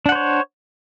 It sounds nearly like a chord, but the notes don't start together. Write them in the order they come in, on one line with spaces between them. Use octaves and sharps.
D4 F#5 C5 C#5